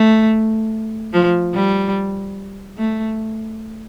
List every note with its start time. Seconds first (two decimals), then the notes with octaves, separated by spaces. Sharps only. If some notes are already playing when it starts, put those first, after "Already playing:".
Already playing: A3
1.13 F3
1.54 G3
2.78 A3